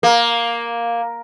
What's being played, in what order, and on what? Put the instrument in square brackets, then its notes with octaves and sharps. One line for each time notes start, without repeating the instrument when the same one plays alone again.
[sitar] A#3